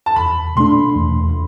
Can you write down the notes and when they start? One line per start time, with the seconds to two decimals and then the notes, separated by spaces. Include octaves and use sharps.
0.06 A5
0.16 E2 B5
0.56 B2 A3 D4 C6
0.96 E2